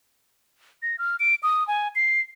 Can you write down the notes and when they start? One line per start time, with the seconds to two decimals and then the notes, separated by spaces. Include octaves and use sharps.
0.82 A#6
0.99 F6
1.20 D7
1.43 D#6
1.68 G#5
1.96 C7